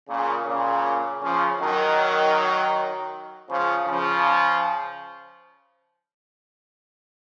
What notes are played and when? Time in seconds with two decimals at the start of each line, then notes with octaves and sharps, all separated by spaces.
0.09 A#2 C#3
0.46 A#2 C#3
1.23 C#3 F3
1.60 D#3 F#3
3.48 C#3 F3
3.87 C#3 F3